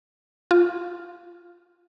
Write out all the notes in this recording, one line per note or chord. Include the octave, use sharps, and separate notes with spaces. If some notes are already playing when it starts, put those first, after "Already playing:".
F4